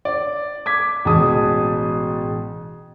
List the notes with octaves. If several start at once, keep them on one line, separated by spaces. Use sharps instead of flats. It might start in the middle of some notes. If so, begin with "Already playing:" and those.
D5
D6 G#6 B6
A1 B2 G#3 A5 D#6